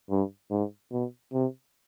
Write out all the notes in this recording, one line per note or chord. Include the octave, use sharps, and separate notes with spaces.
G2
G#2
B2
C3